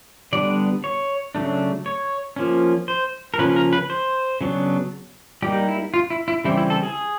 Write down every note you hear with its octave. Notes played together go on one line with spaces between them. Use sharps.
D3 G3 B3 D4 D5
C#5
C#3 F#3 A3 D4
C#5
F3 A#3 C#4
C5
A#4
C#3 F3 A#3 C#4 B4
A#4
B4
C5
C#3 F#3 B3 D4
G3 A#3 D#4 G4
E4
F4
E4
E4
C#3 E3 G3 C4 E4
E4
A4
G#4